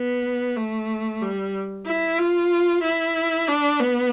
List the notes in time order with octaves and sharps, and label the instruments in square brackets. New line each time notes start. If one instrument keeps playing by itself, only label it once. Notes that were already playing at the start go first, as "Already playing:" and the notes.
Already playing: [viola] B3
A3
G3
E4
F4
E4
D4
B3